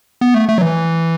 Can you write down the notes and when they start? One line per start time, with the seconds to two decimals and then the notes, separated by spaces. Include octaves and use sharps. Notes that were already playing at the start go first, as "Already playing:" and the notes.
0.21 B3
0.34 A3
0.49 A3
0.58 F#3
0.62 E3